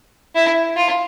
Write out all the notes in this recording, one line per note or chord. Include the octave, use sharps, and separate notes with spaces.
E4
F4